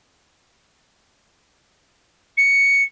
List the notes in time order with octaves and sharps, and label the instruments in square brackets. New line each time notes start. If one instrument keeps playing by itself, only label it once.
[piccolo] C#7